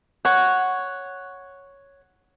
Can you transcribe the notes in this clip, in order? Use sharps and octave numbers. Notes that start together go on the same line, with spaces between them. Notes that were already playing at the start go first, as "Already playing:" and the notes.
C#5 F#5